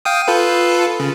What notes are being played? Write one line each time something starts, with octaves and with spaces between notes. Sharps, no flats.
F5 G5 D#6
F4 A4 B4
C#3